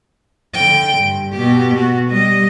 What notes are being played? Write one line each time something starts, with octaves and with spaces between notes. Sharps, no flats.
D3 G5
G2
B2 G4
F#4
G3 D#5